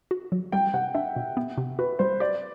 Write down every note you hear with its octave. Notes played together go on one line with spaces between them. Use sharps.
F#4
F#3
G3 G5
C3 F#5
D4 E5
B2
B3
C3
F#4 B4
G3 C5
G4 D5